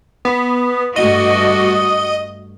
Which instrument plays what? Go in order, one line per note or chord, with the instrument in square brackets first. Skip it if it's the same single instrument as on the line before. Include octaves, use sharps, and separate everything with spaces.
[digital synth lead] B3
[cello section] G2 A3 F#4 [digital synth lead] D#5